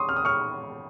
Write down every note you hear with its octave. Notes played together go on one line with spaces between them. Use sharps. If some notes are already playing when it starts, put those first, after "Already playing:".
Already playing: C6 C#6 D#6
F6
D#6
C#6 F6